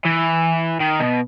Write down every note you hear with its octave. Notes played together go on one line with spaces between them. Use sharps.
E3
D#3
B2